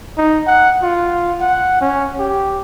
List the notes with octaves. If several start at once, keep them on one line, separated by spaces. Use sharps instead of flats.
D#4
F#5
F4
F#5
C#4
G4